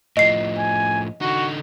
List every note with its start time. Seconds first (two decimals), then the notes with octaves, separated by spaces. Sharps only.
0.17 A2 F3 D#5 C7
0.58 G#5
1.22 D3 D#4 F#4